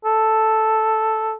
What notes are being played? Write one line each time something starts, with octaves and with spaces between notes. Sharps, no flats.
A4